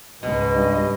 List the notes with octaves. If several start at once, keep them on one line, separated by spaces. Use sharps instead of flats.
C#2 G#2 B2 D#5
G2